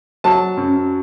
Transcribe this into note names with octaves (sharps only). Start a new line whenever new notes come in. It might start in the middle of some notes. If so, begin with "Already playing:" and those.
F#3 A5
F#2